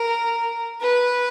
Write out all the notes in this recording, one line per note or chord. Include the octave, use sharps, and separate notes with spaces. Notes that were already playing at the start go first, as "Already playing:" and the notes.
Already playing: A#4
B4